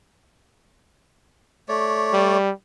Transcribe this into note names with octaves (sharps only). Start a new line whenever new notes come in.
A3 C#5 D5
G3